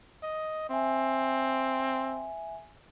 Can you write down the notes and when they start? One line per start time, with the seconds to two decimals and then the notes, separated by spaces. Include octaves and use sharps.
0.23 D#5
0.70 C4 E5 G#5